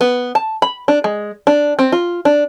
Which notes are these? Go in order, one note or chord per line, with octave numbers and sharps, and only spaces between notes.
B3
A5
B5
D4
G#3
D4
C4
F4
D4